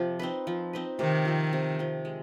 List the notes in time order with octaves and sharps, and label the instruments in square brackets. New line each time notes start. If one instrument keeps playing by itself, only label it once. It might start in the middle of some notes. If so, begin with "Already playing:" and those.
Already playing: [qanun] C3 F3
C4 D#4 B4
F3
C4 D#4 B4
[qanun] C3 [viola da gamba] D#3
[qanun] F3 C4
C3
F3 C4
G#3